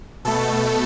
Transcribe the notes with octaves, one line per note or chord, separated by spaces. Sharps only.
B2 A3 A4